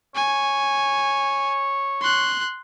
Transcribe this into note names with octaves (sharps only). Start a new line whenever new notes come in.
C#5 G#5
C6 F#6